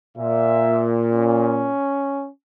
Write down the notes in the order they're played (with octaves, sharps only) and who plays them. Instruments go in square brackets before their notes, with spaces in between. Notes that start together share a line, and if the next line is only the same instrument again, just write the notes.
[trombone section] A#2 [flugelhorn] E5
[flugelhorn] C#4